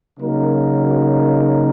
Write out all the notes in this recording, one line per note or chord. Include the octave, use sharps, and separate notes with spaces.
C#3 F#3 A#3 D#4 A#4